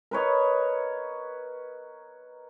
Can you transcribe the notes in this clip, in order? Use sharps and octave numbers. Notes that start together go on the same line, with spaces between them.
A#4 B4 C#5 D#5